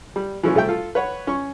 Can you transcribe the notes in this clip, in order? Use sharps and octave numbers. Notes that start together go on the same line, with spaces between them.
G3
E3 F3 A3 C#4
C2 A3 E5 G5
F4 A4
B4 C#5 F#5
C#4 C#6